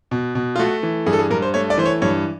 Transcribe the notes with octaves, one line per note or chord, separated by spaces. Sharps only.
B2
B2
F4
A3 F#4
E3
G2 G#4
A4
G#4
G2 A#4
C5
A3 C#5
D5
E3 C5
C#5
G2 C#5